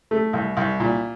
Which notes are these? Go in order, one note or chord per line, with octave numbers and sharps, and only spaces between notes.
A3
C2
C2
A#2